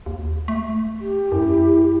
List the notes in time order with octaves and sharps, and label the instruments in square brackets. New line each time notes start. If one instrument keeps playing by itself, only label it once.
[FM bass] D#2
A3
[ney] G4
[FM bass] F#2 [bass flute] E4